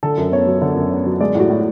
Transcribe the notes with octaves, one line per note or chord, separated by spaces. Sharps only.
D3 A4
F#2
B3 C#5
F#3
D3
F#2
B3
F#3
G#3 D5
A2 F#4
A2